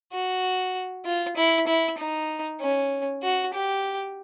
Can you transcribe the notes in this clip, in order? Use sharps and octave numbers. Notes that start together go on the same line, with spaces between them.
F#4
F4
E4
E4
D#4
C#4
F#4
G4